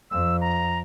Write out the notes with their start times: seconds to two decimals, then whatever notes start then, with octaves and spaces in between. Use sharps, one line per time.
0.11 F2 E6
0.41 A#5